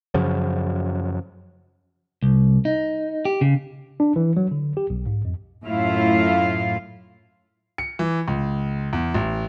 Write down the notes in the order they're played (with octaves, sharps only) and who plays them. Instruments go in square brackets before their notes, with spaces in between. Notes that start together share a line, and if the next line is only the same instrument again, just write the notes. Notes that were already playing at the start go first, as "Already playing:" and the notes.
[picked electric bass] F#2 C#3 F3 F#3
[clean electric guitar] C2
D#4
G4
C#3
[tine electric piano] D4
E3
F#3
D3
G4
B1
G#2
F2
[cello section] F#2 A2 E4 F4 F5
[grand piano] C#7
E3
C#2
E2
A1